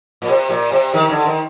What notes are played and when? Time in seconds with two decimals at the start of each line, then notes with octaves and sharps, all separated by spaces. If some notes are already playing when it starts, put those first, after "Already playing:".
0.22 A#2
0.28 C3
0.50 A#2
0.72 C3
0.94 D#3
1.09 D3
1.25 D#3